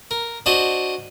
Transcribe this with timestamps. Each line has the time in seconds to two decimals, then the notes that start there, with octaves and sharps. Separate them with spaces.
0.11 A#4
0.46 D4 F#4 C5 D#5